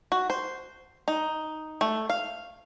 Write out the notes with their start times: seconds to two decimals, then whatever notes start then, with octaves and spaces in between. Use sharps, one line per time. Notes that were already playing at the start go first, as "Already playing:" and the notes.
0.12 F#4
0.30 C5
1.08 D#4
1.81 A3
2.10 F5